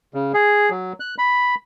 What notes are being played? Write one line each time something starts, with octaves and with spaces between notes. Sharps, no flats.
C#3
G#4
F#3
F#6
B5